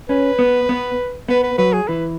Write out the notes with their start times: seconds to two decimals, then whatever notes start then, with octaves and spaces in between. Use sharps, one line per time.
0.09 C#4 B4
0.39 B3
0.69 B3
1.29 B3 B4
1.43 B4
1.58 F#3 B4
1.73 G#4
1.88 E3 B4